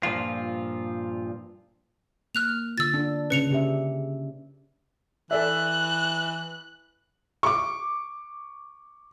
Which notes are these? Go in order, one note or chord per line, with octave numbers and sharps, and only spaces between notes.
G2 A#2 F3 F4
A#3 F6 F#6 F7
D3 F4 E6 A6
D4
C#3 C#4 B4 C#7 F7
C#3 G4 E5
E3 A4 D5 E5 F#6
C#6 D6